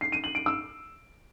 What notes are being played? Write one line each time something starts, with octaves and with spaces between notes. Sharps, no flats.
C7
D#7
F#7
D7
E6